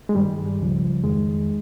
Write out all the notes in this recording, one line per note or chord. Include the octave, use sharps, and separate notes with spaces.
G#3
G2 D#3 G3
C#2 C#3 F3
F2 D#3 G#3